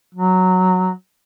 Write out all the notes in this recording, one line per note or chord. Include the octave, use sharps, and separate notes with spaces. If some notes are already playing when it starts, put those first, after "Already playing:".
F#3